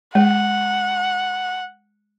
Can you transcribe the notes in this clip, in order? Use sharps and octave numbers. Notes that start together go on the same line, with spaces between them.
G#3 F#5